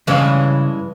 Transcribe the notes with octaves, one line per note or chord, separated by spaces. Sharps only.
G2 C#3 E3 G#3 C#4 F5